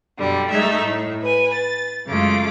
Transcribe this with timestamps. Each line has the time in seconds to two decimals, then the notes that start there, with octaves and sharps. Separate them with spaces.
0.17 F#2 B2 D3 G3
0.50 G3 A3 D#4 E5
0.82 A2
1.21 B4 G#5
1.54 A6
2.06 F#2 C#3 G#3 A3 F4 D6